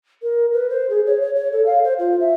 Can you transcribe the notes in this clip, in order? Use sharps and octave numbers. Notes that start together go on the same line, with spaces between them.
A#4
B4
C5
G#4
C#5
C#5
C#5
A4
F5
C5
F4
E5